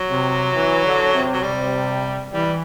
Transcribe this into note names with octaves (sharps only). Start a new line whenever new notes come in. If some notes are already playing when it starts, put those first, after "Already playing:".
Already playing: F#3
C3
E3
D3
C3
F#3
C3 G3
E3 G3